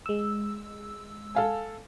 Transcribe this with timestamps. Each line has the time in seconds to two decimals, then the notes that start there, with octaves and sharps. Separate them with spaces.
0.06 G#3 E6
1.35 A4 F5 G#5